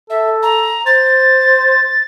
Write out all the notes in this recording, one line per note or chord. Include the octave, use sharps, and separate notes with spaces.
A4 E5
A#5
C5 A6